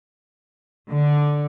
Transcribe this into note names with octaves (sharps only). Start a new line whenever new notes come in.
D3